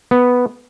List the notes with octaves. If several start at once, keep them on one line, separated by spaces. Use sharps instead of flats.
B3